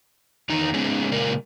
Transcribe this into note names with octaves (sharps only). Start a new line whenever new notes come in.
E2 D#3 D#4 A#5
G#3 B3 C#4 D#4 G#4
A#2 C#3 G#3 A#4 D5